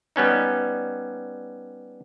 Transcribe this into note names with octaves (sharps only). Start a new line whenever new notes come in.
G3 B3 C#4 D#4